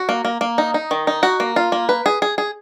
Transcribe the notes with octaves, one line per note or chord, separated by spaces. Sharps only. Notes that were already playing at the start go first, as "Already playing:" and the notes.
Already playing: F#4
A#3
A#3
A#3
D#4
D#4
D#3
D#4
F#4
A#3
F4
A#3
B4
G#4
G#4
G#4